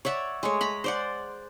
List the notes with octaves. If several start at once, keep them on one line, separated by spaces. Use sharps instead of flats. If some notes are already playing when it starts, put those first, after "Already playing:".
C#5 D5 E5 F#5
G#3 A3 C#5
A#5 B5
C5 D5 F#5